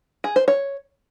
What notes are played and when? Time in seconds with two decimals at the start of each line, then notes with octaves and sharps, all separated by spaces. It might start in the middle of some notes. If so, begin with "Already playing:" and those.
0.24 G#4
0.36 C5
0.48 C#5